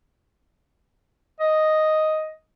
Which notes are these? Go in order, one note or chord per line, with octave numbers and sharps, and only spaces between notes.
D#5